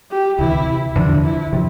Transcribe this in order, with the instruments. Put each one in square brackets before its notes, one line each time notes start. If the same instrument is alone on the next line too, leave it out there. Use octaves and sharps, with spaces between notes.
[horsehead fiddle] G4
[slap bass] D2 C3 E3 [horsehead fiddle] E4
[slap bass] E2 D3 F3 [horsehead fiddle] D4
[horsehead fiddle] E4
[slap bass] C3 F3